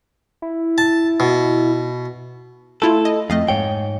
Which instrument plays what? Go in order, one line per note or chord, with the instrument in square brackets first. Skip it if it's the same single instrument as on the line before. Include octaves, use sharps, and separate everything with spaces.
[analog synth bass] E4
[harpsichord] A5
B2
[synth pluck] A3 E4 F4 [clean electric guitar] A4
[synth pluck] D#5
[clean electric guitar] F2 [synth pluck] A3 D#5 F5
[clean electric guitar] G#2 C#5 G5